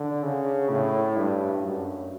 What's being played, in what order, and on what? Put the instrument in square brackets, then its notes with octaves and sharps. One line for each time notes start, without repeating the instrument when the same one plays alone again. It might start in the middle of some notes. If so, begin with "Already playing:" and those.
Already playing: [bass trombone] D3
C#3
A2
G2
F#2